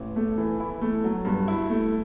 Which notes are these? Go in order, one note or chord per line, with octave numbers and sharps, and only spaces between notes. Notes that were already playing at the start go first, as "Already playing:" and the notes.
Already playing: A1
A3
E3
E4
A3
F#3
G2
E4
A3